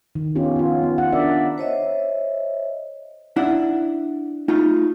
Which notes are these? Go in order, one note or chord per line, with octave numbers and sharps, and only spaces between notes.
D#3
B3 C#4 D#4 F4 G4
B3 F4
B3
F#5
D4 A#4 D5 E5
C5 C#5 D#5 E5
D4 E4 F#5
A3 D#4 F4